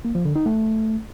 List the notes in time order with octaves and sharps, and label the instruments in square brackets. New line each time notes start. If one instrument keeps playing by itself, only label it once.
[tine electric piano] A#3
F3
D3
D#4
A3